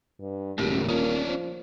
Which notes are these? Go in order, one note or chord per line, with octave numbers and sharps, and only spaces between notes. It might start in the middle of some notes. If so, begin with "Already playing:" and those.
G2
D#1 F#2 A2 C#3 A#3 G4
A#3 C#4 D4 F4
F3